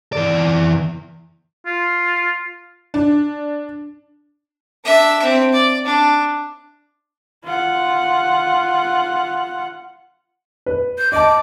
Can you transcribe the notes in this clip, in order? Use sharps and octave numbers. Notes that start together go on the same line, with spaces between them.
E3 D5
F4
D4
D4 E5
C4
D5
D4
F4 F#5
B4
G6
D#5 A5 D6